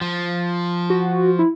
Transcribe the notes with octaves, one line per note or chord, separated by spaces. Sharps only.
F3
F#4
E4